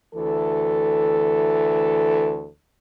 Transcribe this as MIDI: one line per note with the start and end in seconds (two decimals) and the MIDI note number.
0.14 2.49 38
0.14 2.49 52
0.14 2.49 69